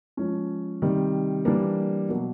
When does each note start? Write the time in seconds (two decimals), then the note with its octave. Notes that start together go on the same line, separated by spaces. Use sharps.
0.17 F3 G#3 C#4
0.82 C3 D#3 G3
1.45 E3 G3 A#3 D4
2.09 B2 F#3 A#3